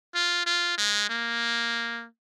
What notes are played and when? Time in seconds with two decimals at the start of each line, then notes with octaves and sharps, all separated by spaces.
0.15 F4
0.46 F4
0.78 G#3
1.09 A#3